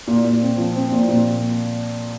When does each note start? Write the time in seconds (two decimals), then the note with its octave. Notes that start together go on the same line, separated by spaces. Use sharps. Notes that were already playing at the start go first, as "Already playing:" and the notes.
0.07 A#2
0.24 A#2
0.41 C4
0.58 F3
0.75 C4
0.92 A#2
1.08 A#2